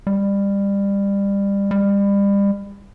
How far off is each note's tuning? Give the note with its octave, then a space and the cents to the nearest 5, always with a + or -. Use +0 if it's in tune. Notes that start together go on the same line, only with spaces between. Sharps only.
G3 +25
G3 +35